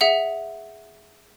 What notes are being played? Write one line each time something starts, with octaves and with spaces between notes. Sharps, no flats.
G#4 E5 F#5